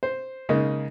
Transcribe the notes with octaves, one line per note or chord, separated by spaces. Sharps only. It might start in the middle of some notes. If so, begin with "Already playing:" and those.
C5
C#3 G#3 A#3 D#4